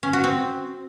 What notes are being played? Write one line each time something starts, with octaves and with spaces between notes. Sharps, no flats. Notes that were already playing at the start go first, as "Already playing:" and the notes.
C#4
F#4
C4